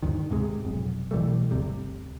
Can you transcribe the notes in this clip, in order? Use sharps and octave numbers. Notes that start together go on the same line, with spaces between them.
D2 G2 D#3
G#2 C3 G#3
F1 B1
B2 E3 G3 A3
G1 D2 C3 G3